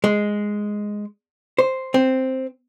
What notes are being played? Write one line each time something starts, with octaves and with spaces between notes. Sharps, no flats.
G#3
C5
C4